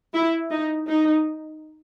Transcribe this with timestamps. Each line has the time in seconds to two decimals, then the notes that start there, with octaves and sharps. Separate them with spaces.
0.14 E4
0.51 D#4
0.88 D#4